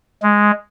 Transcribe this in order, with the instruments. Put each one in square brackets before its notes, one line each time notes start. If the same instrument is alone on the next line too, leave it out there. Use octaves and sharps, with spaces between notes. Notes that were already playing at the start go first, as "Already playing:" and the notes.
[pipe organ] G#3